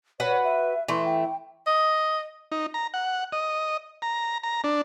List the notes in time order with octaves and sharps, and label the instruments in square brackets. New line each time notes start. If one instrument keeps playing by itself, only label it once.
[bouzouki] F#4 B4 F#5 [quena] C#5
[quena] E5
[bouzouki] E3 A3 [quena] C6
[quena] G5
[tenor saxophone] D#5
[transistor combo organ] D#4
A#5
F#5
D#5
A#5
A#5
D4